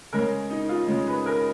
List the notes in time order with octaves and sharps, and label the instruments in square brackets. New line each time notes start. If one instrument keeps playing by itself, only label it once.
[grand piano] C#3 G#3 C#4 [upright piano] A#4
[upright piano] D#4
F4
[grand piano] C#3 G#3 C#4
[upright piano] B4
A#4